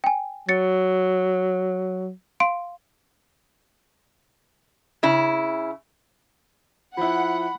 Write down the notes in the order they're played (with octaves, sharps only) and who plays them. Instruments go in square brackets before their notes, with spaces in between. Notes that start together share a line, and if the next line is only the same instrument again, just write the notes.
[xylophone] G5 G#5
[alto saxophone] F#3 [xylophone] A6 C#7
[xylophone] F5 C6 D7
[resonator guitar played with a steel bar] C#3 E4
[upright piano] F3 E4 [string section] F#5 [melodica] B5